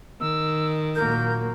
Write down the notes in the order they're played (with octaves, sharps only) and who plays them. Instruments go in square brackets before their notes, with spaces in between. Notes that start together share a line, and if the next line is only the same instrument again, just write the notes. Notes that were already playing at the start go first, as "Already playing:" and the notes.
[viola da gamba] D#3 [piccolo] E6
[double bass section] A#2 F#3 A#3 [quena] A#4 [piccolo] G6